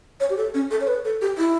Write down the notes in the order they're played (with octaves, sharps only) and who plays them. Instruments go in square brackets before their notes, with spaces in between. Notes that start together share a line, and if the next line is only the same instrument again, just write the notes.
[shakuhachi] C#5
G4
A4
C#4
A4
C#5
B4
A4
G4
E4